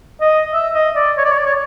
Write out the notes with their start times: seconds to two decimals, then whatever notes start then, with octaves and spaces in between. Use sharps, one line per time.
0.21 D#5
0.53 E5
0.74 D#5
0.95 D5
1.17 C#5
1.25 D5
1.31 C#5
1.38 D5
1.46 C#5